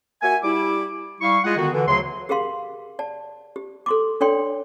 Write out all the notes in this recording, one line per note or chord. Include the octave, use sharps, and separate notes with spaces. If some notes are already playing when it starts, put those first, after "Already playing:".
A#3 F#4 E5 G#5
G3 E4 D6
G3 E4 F5 C#6
G#3 F4 G#4 D#5 F#5
D3 D#3 B3 F#4
D3 E3
D2 C#3 F#3 C#5 C6
G4 G#4 A#4 F5 C6
D5 A5
G4
A4 C6 D6
D4 A4 C#5 D5 G5 C6